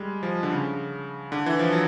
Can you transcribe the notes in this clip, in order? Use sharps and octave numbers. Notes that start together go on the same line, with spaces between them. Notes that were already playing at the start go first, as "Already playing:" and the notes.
Already playing: G3 G#3
F3
D3
C#3
D3
E3
F3
F#3